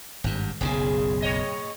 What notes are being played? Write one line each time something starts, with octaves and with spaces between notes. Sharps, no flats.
G#1 G2
F#1 B1 C#3 G#4
A2 C#5 D#5